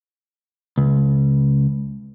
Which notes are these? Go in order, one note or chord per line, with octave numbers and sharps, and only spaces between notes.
C#2